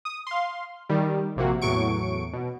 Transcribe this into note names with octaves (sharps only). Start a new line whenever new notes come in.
D#6
F5 C6
D#3 G3
A#1 C3 A#3 F#4
E2 A2 F#3 C#6 D7
B2